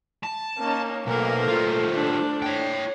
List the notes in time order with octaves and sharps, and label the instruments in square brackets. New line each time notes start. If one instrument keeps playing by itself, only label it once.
[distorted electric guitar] A5
[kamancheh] A#3 [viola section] C#4 D#4
[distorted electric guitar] B1 [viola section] A3 A4 C5 [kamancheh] A#3 A#4
[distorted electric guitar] G3 F4
[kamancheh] D4
[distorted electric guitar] C#5 G5